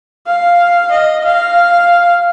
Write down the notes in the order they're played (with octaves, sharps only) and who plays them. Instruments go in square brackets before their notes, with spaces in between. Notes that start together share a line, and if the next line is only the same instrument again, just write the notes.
[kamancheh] F5
D#5
F5